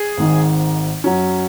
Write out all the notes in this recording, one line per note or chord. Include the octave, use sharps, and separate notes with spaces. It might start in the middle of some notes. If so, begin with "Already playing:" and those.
Already playing: G#4
G#1 G#2 D#3
F#2 F#3 C#4